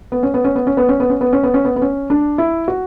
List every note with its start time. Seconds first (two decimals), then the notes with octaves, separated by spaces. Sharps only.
0.12 B3
0.23 C#4
0.34 B3
0.44 C#4
0.55 B3
0.67 C#4
0.77 B3
0.89 C#4
1.00 B3
1.10 C#4
1.21 B3
1.33 C#4
1.43 B3
1.54 C#4
1.65 B3
1.76 B3
1.82 C#4
2.10 D4
2.38 E4
2.68 F#4